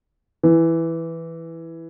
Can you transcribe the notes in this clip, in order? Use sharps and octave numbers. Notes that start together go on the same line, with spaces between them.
E3